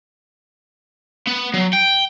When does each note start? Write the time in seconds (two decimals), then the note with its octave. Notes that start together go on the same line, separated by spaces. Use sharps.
1.27 B3
1.54 F#3
1.73 G5